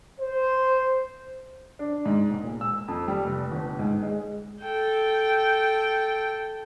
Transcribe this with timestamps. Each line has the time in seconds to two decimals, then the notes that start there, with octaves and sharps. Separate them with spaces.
0.19 C5
1.79 D4
2.05 G#2
2.30 E1
2.43 A#2
2.61 E6
2.88 F2
3.08 G3
3.24 F1
3.51 G1
3.79 G#2
4.03 G#3
4.62 A4 G5